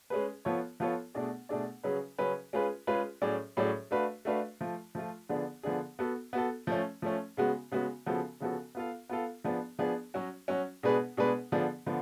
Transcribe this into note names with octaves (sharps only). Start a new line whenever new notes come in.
G#3 C#4 G#4 B4
F3 B3 F4 A4 C#5
F3 B3 F4 A4 C#5
B2 A3 D4 G#4 D5
B2 A3 D4 G#4 D5
C#3 F#3 C#4 G#4 B4
C#3 F#3 C#4 G#4 B4
G#3 C#4 F4 G#4 B4
G#3 C#4 F4 G#4 B4
A2 F#3 C#4 G#4 D5
A2 F#3 C#4 G#4 D5
A3 D4 F#4 B4 F5
A3 D4 F#4 B4 F5
F3 A3 F4
F3 A3 F4
D3 F3 B3 D4 G#4
D3 F3 B3 D4 G#4
B3 F#4 A4
B3 F#4 A4
F3 A3 C#4
F3 A3 C#4
C#3 G#3 B3 F#4
C#3 G#3 B3 F#4
C#3 F3 B3 F#4 A4
C#3 F3 B3 F#4 A4
B3 F4 A4 F5
B3 F4 A4 F5
F3 B3 D4 G#4
F3 B3 D4 G#4
F#3 C#4 F#4
F#3 C#4 F#4
B2 G#3 D4 G#4 B4
B2 G#3 D4 G#4 B4
D3 F3 B3 D4 G#4
D3 F3 B3